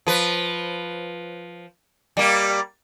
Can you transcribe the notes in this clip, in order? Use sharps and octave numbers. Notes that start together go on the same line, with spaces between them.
F3 B4
G3 A#3